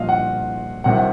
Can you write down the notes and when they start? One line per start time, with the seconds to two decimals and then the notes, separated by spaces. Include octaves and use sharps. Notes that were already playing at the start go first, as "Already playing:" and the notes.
Already playing: C2 A#2 F3 D#5 F5
0.09 F#5
0.84 C2 C3 D#3 F#3 F#5
0.95 F#5